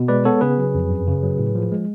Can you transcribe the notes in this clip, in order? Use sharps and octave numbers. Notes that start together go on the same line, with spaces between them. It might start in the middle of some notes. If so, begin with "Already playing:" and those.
Already playing: B2
G#3 B4 D5
B3 A4 C#5
C#3 G#4 B4
F#3
F2
F#2
C#3
F#3
A2
F3
G#3